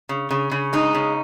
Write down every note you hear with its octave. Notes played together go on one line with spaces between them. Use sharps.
C#3
C#3
C#3
G#3 D#4
C#3